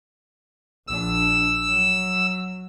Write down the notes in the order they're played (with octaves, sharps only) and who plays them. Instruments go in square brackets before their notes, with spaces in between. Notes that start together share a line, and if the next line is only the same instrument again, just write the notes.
[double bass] A#1 D4 [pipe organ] E6
[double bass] F#3